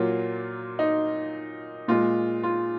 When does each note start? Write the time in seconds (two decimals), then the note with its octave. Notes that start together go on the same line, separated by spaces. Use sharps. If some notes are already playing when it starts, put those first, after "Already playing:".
Already playing: A#2 F#3 A#3 F4
0.79 D#4
1.88 A#2 G#3 F4
2.43 F4